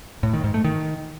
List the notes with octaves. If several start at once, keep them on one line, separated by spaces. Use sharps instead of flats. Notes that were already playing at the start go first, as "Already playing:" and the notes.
A2
D#3
G#2
A3
D#3